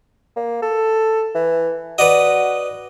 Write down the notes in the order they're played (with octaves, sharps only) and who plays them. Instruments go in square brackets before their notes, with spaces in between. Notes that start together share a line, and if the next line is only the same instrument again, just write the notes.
[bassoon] A#3
A4
E3
[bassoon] F#4 [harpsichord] B4 D5 D#5